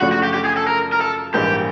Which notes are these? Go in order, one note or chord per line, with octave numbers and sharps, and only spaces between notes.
F#2 C#3 F3 A3 D4 F#4
F#4
G4
G4
G#4
A4
A#4
A#4
A4
A#1 G#2 E3 G3 A#3 G4